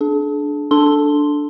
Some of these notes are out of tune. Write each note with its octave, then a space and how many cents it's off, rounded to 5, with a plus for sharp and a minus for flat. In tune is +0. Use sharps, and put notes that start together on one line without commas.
D4 +0 G#4 +45
D4 +0 A4 +0 C6 +0